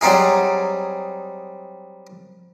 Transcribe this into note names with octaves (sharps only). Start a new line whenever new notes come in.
F#3 G3 C4 D#4 G#4